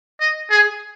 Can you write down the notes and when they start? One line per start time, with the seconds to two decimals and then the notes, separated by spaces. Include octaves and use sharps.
0.20 D#5
0.50 G#4